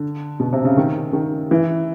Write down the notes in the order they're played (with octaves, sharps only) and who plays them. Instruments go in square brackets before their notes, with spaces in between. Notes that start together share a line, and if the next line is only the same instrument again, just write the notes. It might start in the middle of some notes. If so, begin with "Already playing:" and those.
Already playing: [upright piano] D3
B2
C3
C#3
D#3
D#3
E3